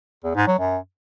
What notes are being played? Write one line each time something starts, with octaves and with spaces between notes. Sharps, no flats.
E2
G#2
F#3
F#2